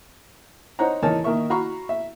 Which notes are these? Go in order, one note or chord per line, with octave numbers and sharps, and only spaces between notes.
D#4 C5 C#5 F#5 A#5
E2 D#4 A#4 C#5 G#5 A5
D#3 A#3 A#4 E5 C#6
F#4 F5 A#5 B5 C#6
E5